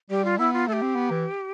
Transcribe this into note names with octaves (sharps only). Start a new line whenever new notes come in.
G3 G4
F4
B3 E4
F4
A3 A4
G4
C4
B3
E3